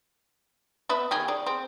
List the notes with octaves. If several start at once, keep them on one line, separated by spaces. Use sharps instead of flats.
B3 B4 E5
D#3 G4 G#4
G#4 D5
C4